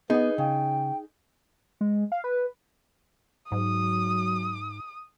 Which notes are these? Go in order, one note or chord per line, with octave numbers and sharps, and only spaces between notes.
B3 D#4 G#4 B4 F#5
C#3 G5
G#3
F5
B4
G#2 F#3 D#6